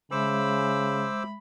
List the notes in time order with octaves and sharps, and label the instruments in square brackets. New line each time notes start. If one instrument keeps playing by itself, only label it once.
[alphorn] C#3 [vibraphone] G#3 E5 [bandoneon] C5 D6 E6 [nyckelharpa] B5